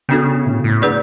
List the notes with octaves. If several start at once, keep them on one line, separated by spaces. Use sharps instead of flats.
C#3 B3 D4 F#4 A4
A2
A2
A3 D4 G#4 B4 D5